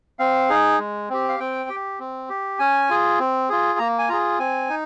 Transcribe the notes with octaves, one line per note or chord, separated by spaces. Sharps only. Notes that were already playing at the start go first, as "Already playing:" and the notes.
C4 F5
D#4 G#4
G#3
C4 G4
F5
C4 G5
G4
C4
G4
C#4 G#5
F4 G#4
C4
F4 G#4
A#3 A#5
G#5
F4 G#4 A#5
C4 G#5
D#4